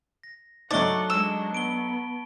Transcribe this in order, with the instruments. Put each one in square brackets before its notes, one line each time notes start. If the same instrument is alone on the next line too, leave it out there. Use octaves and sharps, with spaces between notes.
[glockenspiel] A#6
[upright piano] F#3 A3 D#4 [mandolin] D5 [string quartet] F#5 [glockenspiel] A5 C#6 G7
[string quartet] G#3 D4 [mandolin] E6
[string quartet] B3 [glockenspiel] D7 G7